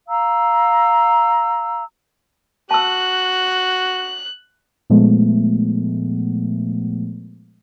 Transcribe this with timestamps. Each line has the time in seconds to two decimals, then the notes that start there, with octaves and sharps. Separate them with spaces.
0.08 F5 A#5 E6
2.71 F#4 A5 E6 F#6
4.90 A#2 F3 G#3 A3 B3